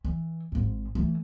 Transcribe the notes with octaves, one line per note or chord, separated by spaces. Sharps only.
E3
G#1 G#2
E3 A3